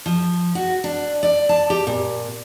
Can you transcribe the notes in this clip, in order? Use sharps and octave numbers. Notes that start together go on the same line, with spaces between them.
F3
F#4
D4
D5
A5
G4
A#2